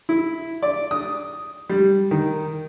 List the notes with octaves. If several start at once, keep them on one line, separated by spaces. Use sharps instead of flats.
E4
D5
D#6
G3
D#3